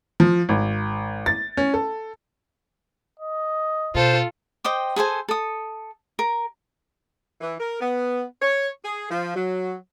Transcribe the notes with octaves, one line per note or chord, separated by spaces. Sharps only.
F3
G#1
A6
C#4
A4
D#5
B2 F4 A4 C5
C5 D#5 G5 D6
G#4 A4 C5 G#5
A4 D#6
A#4
E3
A#4
B3
C#5
G#4
F3
F#3